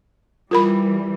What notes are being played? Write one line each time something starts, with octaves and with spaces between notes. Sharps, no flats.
E3 G3 F4 A#4 B5